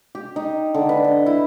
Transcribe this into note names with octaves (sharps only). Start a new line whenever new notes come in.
G4
D#4
D3
B4
D#5
E4